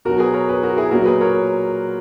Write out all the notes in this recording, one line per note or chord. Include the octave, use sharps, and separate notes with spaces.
B2 F#3 F#4 A#4
G#4 B4
A#4 C#5
G#4 B4
F#4 A#4
E4 G#4
A#2 F#3 F#4 A#4
G#4 B4
A#4 C#5